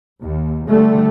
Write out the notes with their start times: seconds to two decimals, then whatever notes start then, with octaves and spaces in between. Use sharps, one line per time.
0.22 D#2
0.68 D3 G3 A3